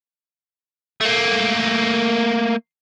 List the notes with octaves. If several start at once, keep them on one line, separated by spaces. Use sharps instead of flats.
A3 A#3